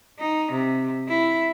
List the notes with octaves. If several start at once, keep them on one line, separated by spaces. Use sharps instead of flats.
D#4
C3
E4